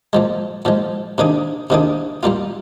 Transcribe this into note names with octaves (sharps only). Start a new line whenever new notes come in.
A#2 F3 G#3
A#2 F3 G#3
C3 D#3 A#3 D4 G#4
C3 D#3 A#3 D4 G#4
A#2 G3 A#3 F4